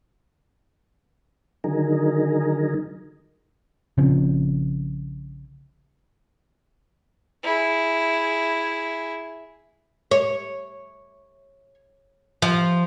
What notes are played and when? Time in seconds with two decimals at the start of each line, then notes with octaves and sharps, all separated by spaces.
1.64 D3 D#3 F#3 D#4 G#4 A#4
3.98 A#1 C#3 F3 C4
7.43 E4 G#4
10.11 C#5
12.42 F3